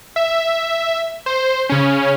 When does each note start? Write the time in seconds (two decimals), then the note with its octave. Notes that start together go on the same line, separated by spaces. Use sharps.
0.16 E5
1.26 C5
1.69 C#3 C#4